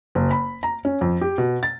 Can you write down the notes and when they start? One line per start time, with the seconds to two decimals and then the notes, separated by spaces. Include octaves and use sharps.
0.15 F#1
0.31 B5
0.63 A#5
0.85 C#4
1.01 F2
1.21 G4
1.38 B2
1.63 A6